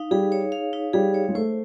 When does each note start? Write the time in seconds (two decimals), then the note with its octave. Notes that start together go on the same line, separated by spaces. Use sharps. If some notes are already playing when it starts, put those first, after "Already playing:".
Already playing: D#4 F5
0.11 G3 G#4
0.32 C#5
0.52 F5
0.73 D#4
0.93 G3 G#4
1.14 C#5
1.28 G#3
1.35 A3 C5